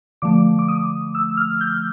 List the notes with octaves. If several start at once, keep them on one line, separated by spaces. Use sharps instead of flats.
D3 F3 A3 D6
D6
D#6
E6
F6
G6